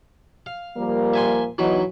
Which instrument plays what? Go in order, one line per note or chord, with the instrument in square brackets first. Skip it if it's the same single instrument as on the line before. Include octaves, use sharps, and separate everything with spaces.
[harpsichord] F5
[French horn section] F3 G3 A#3
[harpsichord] E5 G#5 C6
[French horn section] E2 B3 D#4 [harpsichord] E3 F#3 B4